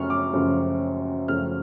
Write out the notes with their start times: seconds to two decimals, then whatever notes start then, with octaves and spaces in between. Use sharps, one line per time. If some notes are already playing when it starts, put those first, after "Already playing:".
Already playing: F#2 C#3 F3 A3 C#6 F6
0.10 D6
0.33 F#2 C#3 F3 A3
1.28 F#2 C#3 F3 A3 F6